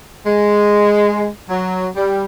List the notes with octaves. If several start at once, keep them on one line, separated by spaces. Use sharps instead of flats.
G#3
F#3
G3